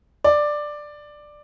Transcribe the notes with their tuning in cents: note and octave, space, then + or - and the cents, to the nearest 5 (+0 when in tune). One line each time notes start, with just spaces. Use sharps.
D5 +10